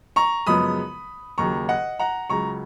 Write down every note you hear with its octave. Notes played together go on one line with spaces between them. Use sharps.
A#5 C#6
F#2 C#3 F3 G#3 B3 B5 D#6
D#2 C#3 F#3 A#5 C#6
D#5 F#5
F#5 A#5
C#2 C#3 F#3 A#5 C#6